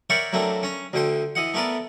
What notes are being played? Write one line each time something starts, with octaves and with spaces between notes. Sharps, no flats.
A#4 C#5 D5 E5 F#5 G5
F#3 A3 A#3 C4 D4
C#4 A#5
D2 D3 G5 C6
E3 D#5 F#5
A3 B3 A#4 B4 D5